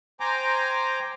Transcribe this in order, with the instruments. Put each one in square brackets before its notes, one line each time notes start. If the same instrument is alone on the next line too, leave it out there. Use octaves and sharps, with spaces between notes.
[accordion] C5 G5 G#5 A#5 D6